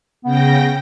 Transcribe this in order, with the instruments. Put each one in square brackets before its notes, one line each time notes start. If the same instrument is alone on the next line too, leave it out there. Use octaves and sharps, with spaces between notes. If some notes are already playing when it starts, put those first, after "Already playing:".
[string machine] C#3 G5 A#6 [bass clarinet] B3